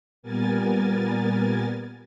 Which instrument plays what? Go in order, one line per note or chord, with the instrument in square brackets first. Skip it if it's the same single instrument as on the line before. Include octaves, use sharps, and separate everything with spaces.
[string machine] A#2 G3 B3 A#4 G#5 A6